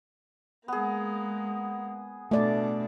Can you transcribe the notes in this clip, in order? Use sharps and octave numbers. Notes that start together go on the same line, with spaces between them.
G#3 A#3 B3 G#4
B2 A3 D4 D5